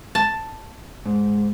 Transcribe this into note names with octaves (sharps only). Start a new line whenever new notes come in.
A5
G#2